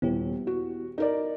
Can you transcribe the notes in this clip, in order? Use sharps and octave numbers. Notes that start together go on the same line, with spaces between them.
D#1 B3 E4 G4
F#4
D#4 A#4 D5